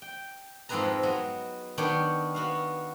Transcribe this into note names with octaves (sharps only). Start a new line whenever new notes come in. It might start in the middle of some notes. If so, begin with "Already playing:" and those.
G5
F2 G#2 C4 G#4 B4 A#5
F#3 B3 D#5
D#3 B3 D4 C#5 G5
B3 F#4 F5